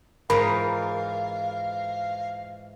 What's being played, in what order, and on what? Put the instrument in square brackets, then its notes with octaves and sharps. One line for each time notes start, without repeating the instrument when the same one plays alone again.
[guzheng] G#2 E3 F4 [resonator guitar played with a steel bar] A#4 [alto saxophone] F5 [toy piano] B5